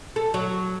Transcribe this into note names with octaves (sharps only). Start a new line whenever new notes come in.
A4
F#3